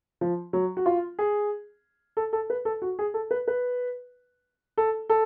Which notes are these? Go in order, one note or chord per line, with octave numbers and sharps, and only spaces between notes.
F3
F#3
F#4
F4
G#4
A4
A4
B4
A4
F#4
G#4
A4
B4
B4
A4
A4